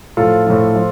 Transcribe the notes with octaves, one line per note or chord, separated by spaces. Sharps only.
A2 F3 F4 A4
A2 F3
F3